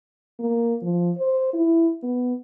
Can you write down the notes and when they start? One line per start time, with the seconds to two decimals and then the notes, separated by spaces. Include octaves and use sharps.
0.40 A#3
0.82 F3
1.18 C5
1.54 E4
2.03 B3